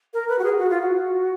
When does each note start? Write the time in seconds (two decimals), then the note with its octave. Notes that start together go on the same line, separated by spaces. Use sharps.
0.14 A#4
0.29 B4
0.39 F#4
0.44 G#4
0.58 F#4
0.70 F4
0.81 F#4